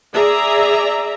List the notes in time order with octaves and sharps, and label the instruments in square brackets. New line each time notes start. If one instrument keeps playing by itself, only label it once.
[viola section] G#4 D5 E5 A#5